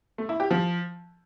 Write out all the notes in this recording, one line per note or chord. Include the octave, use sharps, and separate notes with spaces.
A3
E4
G4
F3